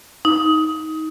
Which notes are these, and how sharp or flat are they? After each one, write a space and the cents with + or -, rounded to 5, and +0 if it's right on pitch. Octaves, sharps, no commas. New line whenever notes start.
D#4 +20